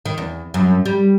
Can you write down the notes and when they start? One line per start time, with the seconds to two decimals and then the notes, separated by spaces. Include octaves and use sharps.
0.06 D#3
0.18 E2
0.54 F#2
0.86 G3